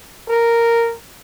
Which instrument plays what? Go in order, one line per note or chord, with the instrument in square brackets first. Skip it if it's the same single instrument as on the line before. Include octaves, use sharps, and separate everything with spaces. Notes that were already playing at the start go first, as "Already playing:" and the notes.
[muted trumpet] A#4